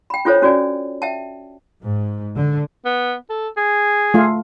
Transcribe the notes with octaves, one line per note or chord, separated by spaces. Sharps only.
G5 B5
D4 F4 A4 C5 C#5
C#4 F#4 D5 G#5
E5 G5 A5
G#2
D3
B3
A4
G#4
A3 F4